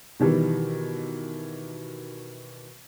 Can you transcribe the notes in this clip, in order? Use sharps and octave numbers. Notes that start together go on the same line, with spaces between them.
B2 D#3 E3 G3